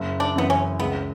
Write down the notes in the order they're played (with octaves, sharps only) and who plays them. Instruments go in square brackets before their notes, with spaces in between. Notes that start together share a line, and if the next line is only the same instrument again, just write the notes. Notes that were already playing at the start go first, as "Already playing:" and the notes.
Already playing: [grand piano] F#1
[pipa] D4
[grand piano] F#2 E3 [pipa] B3
[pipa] C#4
[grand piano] C#2 [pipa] B3